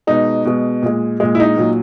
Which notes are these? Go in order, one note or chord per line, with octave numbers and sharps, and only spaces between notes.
B2 G#3 D#4
B2 G#3
A#2 G#3
A#2 G#3
E4
D#4
A#2 F#3